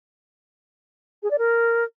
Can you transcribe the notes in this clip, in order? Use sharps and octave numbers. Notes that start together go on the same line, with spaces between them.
G#4
D5
A#4